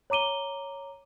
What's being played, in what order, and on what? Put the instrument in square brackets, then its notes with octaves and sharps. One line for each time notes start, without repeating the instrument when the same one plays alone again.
[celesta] C#5 A#5 D6 D#7 G7